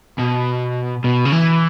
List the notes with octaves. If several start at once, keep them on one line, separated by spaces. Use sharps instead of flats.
B2
B2
C#3
E3